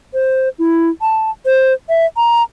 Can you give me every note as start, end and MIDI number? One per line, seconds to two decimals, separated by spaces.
0.13 0.49 72
0.59 0.90 64
1.01 1.31 81
1.46 1.73 72
1.89 2.06 76
2.17 2.43 82